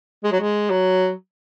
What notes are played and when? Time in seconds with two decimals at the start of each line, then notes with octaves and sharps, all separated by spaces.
0.24 G#3
0.32 F#3
0.40 G#3
0.70 F#3